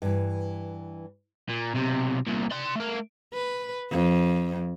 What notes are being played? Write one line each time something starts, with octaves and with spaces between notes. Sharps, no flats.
G2 E3
A#2
B1 C3
C2 A#2
D5 C6
A3 A#4
B4
F2